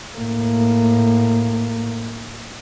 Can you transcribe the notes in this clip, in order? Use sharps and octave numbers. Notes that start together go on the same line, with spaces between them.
A2 A#3